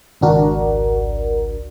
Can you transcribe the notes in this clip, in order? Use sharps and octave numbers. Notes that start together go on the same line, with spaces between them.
G#1 C#2 D4 F#4 A#4